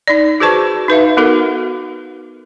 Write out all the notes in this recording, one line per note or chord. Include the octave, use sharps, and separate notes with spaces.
D#4 D5
F#4 G#4 B4 C5 A5 C#6
D#4 B4 E5 F5
B3 D#4 F#4 A4 A#4